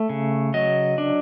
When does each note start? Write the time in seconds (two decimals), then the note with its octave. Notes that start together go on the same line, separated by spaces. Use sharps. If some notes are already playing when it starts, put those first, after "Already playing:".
Already playing: A3
0.09 C#3
0.54 F#3 D#5
0.98 D4